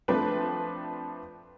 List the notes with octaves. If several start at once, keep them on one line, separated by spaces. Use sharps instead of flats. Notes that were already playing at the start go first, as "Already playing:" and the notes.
F3 A3 C4 D4 B4